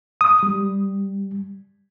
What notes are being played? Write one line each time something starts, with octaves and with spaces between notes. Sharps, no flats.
D#6
G3